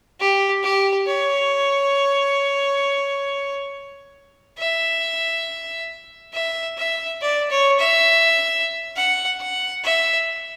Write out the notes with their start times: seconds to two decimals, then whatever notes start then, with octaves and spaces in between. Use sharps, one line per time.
0.20 G4
0.63 G4
1.07 C#5
4.58 E5
6.33 E5
6.77 E5
7.21 D5
7.50 C#5
7.80 E5
8.96 F#5
9.40 F#5
9.84 E5